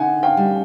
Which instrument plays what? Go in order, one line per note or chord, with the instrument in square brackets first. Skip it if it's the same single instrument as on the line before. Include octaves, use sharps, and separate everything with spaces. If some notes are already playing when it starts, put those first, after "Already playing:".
Already playing: [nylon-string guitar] D3 D#4 [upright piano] F#5 G#5
[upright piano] F5 G5
[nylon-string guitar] G3